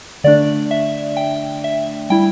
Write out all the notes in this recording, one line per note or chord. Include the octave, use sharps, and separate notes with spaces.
D3 A3 D4 D5
E5
G5
E5
G3 E4 G5